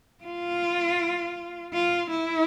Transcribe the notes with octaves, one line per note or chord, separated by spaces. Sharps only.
F4
F4
E4